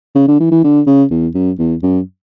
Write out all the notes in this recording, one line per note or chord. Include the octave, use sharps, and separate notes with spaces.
C#3
D3
E3
E3
D3
C#3
E2
F#2
E2
F#2